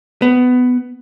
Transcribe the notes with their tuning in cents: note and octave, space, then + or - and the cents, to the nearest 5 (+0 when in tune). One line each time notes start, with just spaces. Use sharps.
B3 +15